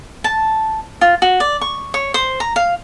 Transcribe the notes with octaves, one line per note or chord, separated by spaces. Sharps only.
A5
F4
F#4
D5
C#6
C#5
C5
A#5
F5